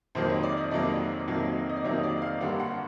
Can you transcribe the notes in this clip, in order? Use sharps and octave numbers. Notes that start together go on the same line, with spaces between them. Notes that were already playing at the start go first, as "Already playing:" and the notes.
F2 C3 D#3 F#3 A#3 C5
C#5
D5
D#5
F2 C3 D#3 F#3 A#3 D5
F2 C3 D#3 F#3 A#3
D#5
D5
F2 C3 D#3 F#3 A#3 C#5
D5
F5
G2 D3 G3 A#3 F#5
F#5